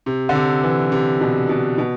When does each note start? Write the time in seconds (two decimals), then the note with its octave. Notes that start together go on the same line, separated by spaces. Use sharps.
0.06 C3
0.29 D3
0.35 C3
0.63 E3
0.92 C3
1.21 B2
1.49 B2
1.78 B2